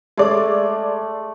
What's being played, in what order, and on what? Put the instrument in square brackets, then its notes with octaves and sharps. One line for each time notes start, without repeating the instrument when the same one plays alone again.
[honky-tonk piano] G#3 D5 [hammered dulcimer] A3